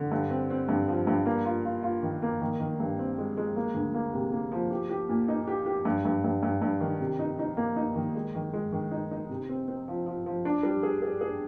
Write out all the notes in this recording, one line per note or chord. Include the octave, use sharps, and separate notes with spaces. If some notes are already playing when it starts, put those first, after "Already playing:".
Already playing: D3
G2
C4
C4
G2
F3
G2
A#3
F4
F4
F4
D#3
A#3
D#3
D#3
G2
C4
G#3
G#3
A#3
D2
A#3
C3
A#3
F3
G4
G4
A#2
D#4
G4
G4
G2
G2
G2
G2
G2
D#3
C3
D#4
D#4
A#3
D#4
D#3
G#3
D#3
G#3
D#3
D#4
D#4
C3
C4
C4
F3
F3
F3
D4
G3
G#4
G#4
G#4